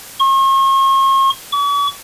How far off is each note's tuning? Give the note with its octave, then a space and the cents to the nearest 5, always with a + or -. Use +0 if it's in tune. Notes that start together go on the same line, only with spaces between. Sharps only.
C#6 -45
C#6 +45